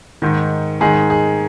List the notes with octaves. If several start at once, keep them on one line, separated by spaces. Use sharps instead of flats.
G#2 D#3
G#2 D#3 G#4
G#4